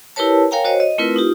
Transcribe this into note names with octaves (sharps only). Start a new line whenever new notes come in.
E4 G4 A#4 B4 C#5 A5
A#4 C#5 F5 G5 G#5 A#5
F#4 C5 C#5 D#5
D#5
A3 C4 E4 F4 A#4 B4
D#4 F4 G4